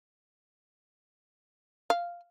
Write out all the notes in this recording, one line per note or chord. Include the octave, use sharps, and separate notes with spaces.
F5